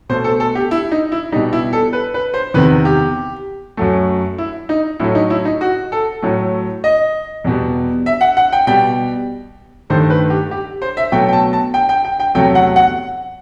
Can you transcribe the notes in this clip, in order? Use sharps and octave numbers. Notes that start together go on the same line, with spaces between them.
B2 A3 C5
A4
A4
G4
E4
D#4
E4
B2 G3 D#4
E4
A4
B4
B4
C5
E2 C3 D#3 B4
G4
F#2 F#3 A3
E4
D#4
A2 F#3 A3 E4
D#4
E4
D#4
F#4
A4
A2 F#3 A3
D#5
E2 B2 G3
E5
F#5
F#5
G5
B2 G3 G5
G2 D#3 A3 C5
B4
G4
G4
C5
E5
B2 F#3 A3 G5
G5
A5
A5
G5
G5
G5
G5
E2 C3 F#3 A3 G5
F#5
F#5